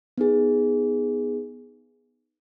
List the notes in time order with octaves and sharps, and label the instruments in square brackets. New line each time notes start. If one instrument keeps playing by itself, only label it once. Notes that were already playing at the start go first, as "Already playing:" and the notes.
[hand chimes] B3 D#4 G#4